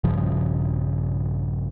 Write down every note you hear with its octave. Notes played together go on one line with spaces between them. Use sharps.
A#1 G2 C#3 F3